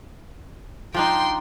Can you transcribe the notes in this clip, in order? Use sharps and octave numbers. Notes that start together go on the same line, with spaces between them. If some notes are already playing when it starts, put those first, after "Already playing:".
F3 D4 D#4 G5 C6